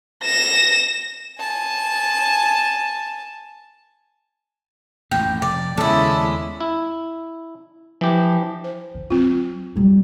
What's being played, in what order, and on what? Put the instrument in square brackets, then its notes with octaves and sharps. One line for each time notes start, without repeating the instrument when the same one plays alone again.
[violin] A#6 E7
G#5 A5
[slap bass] A1 F2 G#2 [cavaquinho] G5
[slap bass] F1 [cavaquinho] D5
[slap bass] D#2 B3 [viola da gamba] C#3 G#3 E4 [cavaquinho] A4 D5
[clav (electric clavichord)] E4
[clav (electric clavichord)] E3 G4 [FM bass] F3
[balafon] C5
[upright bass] D3
[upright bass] F#3 [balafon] C4 F4
[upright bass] F#3 G3